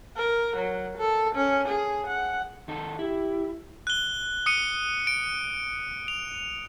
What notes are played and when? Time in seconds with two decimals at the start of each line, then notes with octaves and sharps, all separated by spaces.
0.17 A#4
0.57 F#3
0.98 A4
1.35 C#4
1.68 G#4
2.07 F#5
2.68 D#3 D#4 A4
2.99 E4 G4
3.87 F#6 G7
4.46 D#6 C#7 D#7
5.07 D7
6.08 F7